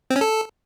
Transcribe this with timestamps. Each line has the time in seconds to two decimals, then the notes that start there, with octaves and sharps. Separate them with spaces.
0.10 C4
0.16 C#4
0.21 A4